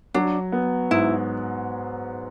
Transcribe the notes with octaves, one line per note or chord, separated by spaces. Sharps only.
F#3 D4
B3
G#2 E4